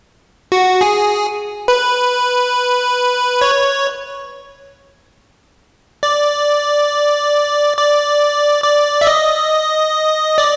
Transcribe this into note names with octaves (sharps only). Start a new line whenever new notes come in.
F#4
G#4
B4
C#5
D5
D5
D5
E5
D#5
D5